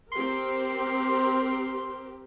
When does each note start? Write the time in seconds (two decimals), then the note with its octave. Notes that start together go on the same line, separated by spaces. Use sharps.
0.12 C4 G4 A#4 C6